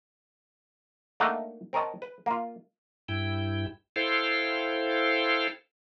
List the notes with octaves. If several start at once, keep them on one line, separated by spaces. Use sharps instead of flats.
A3 A#3 D4 D#4 A4 F#5
C4 A#4 C#5 D#5 A5
B4
A#3 F4
G2 E4 G5
E4 A4 C5 F5 G5